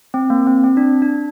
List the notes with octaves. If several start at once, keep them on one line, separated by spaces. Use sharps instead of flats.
C4
A#3
C4
C4
D4
D4